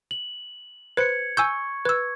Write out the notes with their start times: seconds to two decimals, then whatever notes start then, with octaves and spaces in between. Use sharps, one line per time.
0.11 F#7
0.97 B4 C5 G#6 C#7
1.37 G#5 C#6 E6 G6
1.85 B4 E6 G#6